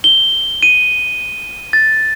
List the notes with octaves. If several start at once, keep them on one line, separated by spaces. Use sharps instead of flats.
G7
D#7
A6